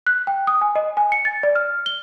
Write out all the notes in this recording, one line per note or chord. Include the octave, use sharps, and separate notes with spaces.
F#6
G5
D#6
G#5
D#5
G#5
C#7
A6
D5
F6
G7